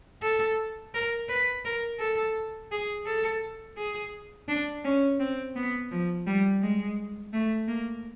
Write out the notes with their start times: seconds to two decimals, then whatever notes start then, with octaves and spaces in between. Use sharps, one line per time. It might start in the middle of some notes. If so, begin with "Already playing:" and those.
0.22 A4
0.94 A#4
1.29 B4
1.65 A#4
1.99 A4
2.72 G#4
3.06 A4
3.77 G#4
4.48 D4
4.84 C#4
5.20 C4
5.56 B3
5.91 F3
6.27 G3
6.62 G#3
7.33 A3
7.68 A#3